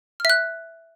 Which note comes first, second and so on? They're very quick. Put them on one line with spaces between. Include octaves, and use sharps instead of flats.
F6 E5 F#6